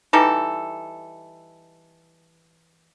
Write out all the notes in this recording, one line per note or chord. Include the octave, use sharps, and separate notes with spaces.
E3 G3 D#4 A4